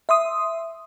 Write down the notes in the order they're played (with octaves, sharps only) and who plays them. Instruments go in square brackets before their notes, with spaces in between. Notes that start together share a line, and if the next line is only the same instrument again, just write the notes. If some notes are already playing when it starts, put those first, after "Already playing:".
[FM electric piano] E5 C6 D#6